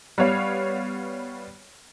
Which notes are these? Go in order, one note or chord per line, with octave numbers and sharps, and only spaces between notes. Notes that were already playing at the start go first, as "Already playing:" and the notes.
G3 B3 C#5 F5